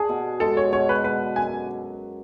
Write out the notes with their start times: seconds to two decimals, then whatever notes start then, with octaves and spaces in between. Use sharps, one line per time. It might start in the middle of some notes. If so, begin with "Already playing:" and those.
Already playing: D4 G#4
0.09 B2
0.40 G#3 A4
0.57 C#5
0.72 B2 C#5
0.89 B4
1.04 D3 B4
1.36 F#2 G#5